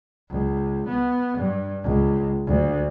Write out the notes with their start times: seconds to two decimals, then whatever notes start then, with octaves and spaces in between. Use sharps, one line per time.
0.29 C#2
0.88 B3
1.38 G2
1.83 C#2
2.46 D2